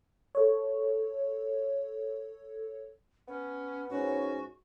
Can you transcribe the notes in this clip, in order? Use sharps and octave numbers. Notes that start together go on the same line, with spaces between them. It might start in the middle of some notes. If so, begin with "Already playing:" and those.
A4 C#5
B3 C#4
G#2 C#4 F#4